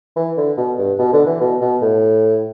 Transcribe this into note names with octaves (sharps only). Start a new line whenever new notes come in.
E3
D3
B2
G2
B2
D3
E3
B2
B2
A2